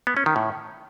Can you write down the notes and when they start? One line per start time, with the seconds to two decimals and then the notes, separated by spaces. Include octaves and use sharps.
0.07 B3
0.17 C#4
0.26 D#3
0.36 A2